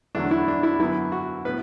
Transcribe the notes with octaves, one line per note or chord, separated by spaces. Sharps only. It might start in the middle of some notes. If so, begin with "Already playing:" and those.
E2 D3 F#3 A3 D4
E4
D4
E4
F#2 D3 F#3 B3 E4
F#4
A2 E3 B3 B4